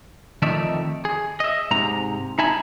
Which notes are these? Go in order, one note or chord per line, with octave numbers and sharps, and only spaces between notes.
F2 D#3 A3 D#4 D5 E5
G#4
D#5 E5
G#2 C3 A#5
D#4 E5 G#5 A5 B5